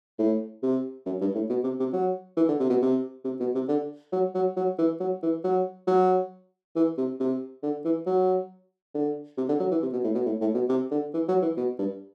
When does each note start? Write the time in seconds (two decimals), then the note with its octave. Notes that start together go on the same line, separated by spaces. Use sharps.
0.19 A2
0.63 C3
1.06 F#2
1.21 G2
1.35 A2
1.50 B2
1.64 C3
1.80 C3
1.93 F#3
2.37 E3
2.49 D3
2.60 C3
2.70 B2
2.82 C3
3.25 C3
3.40 B2
3.55 C3
3.68 D3
4.12 F#3
4.35 F#3
4.57 F#3
4.79 E3
5.00 F#3
5.23 E3
5.44 F#3
5.88 F#3
6.76 E3
6.97 C3
7.20 C3
7.63 D3
7.85 E3
8.06 F#3
8.95 D3
9.38 C3
9.49 D3
9.60 F#3
9.71 E3
9.83 C3
9.93 B2
10.04 A2
10.15 B2
10.26 A2
10.41 A2
10.54 B2
10.69 C3
10.91 D3
11.14 E3
11.28 F#3
11.42 E3
11.57 B2
11.79 G2